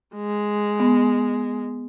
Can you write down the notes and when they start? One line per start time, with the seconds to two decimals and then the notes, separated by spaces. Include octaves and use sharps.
0.16 G#3
0.80 B3